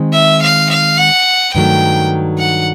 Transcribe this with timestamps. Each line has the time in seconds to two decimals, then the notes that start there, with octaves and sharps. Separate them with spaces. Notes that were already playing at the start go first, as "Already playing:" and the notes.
Already playing: D#3 G#3 C4 D#4
0.13 E5
0.42 F5
0.70 F5
0.98 F#5
1.54 G2 D#3 F#3 A3 G5
2.39 F#5